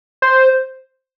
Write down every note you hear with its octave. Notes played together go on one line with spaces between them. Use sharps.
C5